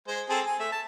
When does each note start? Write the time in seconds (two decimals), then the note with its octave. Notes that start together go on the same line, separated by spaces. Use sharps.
0.08 G#3 C5
0.29 C4 G#4 A4
0.46 G#5
0.59 A3 E5
0.72 A5